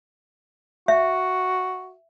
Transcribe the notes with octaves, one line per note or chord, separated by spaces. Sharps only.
F#4 E5